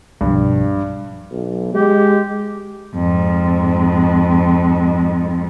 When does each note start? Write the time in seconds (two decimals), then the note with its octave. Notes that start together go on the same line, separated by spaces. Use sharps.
0.21 B1 G2 B2 F3
1.31 B1
1.74 G#3 G4
2.95 F2 G#2